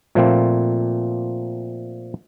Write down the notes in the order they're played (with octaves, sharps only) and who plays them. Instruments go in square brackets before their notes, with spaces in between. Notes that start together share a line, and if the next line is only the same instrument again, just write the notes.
[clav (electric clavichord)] A#2 F3 A3 A#3 C4